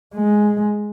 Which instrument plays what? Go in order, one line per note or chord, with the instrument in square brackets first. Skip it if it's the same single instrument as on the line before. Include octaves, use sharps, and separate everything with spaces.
[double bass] G#3